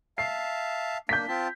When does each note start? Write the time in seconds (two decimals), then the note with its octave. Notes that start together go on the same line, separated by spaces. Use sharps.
0.18 E5 F5 A5 C7
1.09 A#3 D4 G6 B6
1.28 C4 F4 A5